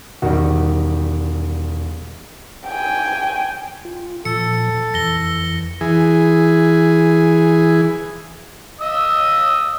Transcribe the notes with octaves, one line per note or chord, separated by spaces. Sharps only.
E1 D#3 G3 F#4
G5 G#5
F4
A#2 F3 A4 C#7
F2 E3 A#6 G7
E3 G#4
D#5 D#6 E6